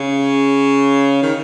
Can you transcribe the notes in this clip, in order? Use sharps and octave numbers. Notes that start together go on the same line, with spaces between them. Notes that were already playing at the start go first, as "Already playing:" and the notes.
Already playing: C#3
D#3